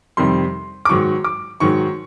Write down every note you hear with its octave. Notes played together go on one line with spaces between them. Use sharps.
F2 C3 D#3 G3 C6
D6
G#2 D#3 F#3 C#6
D6
G#2 D#3 F#3 C#6